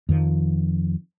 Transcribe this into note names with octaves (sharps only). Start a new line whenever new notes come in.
F2 D#3 F3